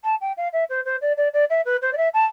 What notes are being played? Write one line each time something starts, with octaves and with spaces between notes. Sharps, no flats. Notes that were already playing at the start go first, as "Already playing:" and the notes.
A5
G5
F5
E5
C5
C5
D5
D5
D5
E5
B4
C5
D5
E5
A5